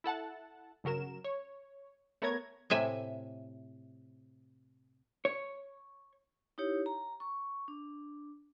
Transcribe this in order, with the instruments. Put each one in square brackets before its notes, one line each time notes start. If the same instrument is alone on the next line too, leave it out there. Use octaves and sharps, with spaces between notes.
[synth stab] E4 A4 F#5 A5
G1 C#3 F#3 A#4 E7
C#5
A3 B3 A#4 C#5 A#5 G#6
[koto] A2 C3 E5 G#5
[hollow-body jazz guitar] C#5
[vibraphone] D#4 E4 G4 C#5
A#5
C#6
D4